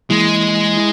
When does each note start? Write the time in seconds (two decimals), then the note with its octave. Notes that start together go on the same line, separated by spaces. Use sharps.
0.10 E3 G#3 A#3 E4
0.77 E4